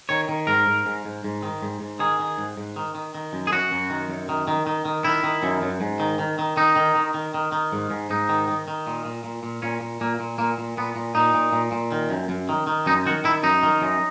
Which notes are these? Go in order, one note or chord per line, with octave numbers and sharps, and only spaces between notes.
D#3 C#5
D#3
G#2 A#4
G#2
G#2
G#2
G#2
D#3
G#2
G#2
D#3 G#4
D#3
G#2
G#2
D#3
D#3
D#3
F#2
G#4
F#2 F#4
F#2
D#3
F#2
D#3
D#3
D#3
D#3
D#3 E4
D#3
F#2
F#2
G#2
D#3
D#3
D#3
D#3 D#4
D#3
D#3
D#3
D#3
D#3
G#2
G#2
G#2 D#4
D#3
D#3
D#3
A#2
A#2
A#2
A#2
A#2 C#4
A#2
A#2 A#3
A#2
A#2 A#3
A#2
A#2 B3
A#2
A#2 D#4
A#2
A#2
A#2
D#3
F#2
F#2
D#3
D#3
F#2 D#4
D#3 F#4
D#3 E4
F#2 D#4
D#3
F#2